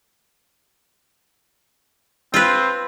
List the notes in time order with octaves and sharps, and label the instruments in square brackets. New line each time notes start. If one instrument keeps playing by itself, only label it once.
[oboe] C4 [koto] F4 B4